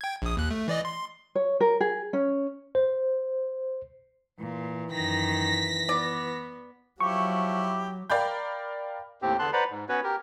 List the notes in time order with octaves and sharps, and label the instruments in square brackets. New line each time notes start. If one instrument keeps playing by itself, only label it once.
[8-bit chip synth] G5 G#6
A#1 D#6
D#2 F#6
A3
E3 D5 D#5
C6
[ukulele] C#5
A#4
G#4
C#4
[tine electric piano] C5
[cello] A#2 [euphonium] E3
[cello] F#2 D#3 [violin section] A#6 B6
[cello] B3 [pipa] D5
[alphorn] F3 [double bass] F#3 [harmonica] E4 G4 [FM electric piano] C#6
[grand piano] A#4 D5 F5 G5 B5 G6
[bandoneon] D#2 A2 C4 G4
E2 D3 B3 A5 C6 F#6
B4 C5 D5 F#5 A#5 B5
G#2
B3 C#4 F#4 B4 C#5
G4 A#4